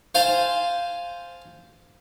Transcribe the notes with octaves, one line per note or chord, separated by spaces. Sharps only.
C5 F5 G#5 A5